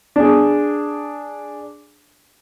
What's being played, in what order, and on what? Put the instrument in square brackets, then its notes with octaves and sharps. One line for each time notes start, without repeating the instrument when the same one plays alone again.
[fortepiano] D4 G#4